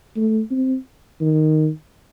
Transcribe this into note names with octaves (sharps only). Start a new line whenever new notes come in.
A3
C4
D#3